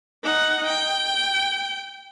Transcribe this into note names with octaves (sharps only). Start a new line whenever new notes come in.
D#4 F#5
G5